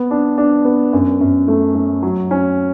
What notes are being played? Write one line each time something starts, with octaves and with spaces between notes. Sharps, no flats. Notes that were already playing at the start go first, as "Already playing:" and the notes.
Already playing: B3
D4
D4
B3
F#2
F#2
A3
A3
F#3
C#4